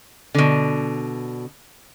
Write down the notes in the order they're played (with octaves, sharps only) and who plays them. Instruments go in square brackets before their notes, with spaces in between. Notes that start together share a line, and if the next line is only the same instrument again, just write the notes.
[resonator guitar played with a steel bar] B2 D3